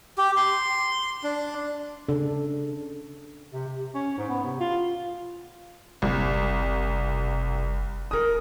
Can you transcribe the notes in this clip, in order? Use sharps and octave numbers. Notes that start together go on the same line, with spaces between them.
G4
C6
D4
C#3 D4 A4
C3
C3
C#4
G#2
B3
C3
F4
F#1 C2
D1 A#4 D#6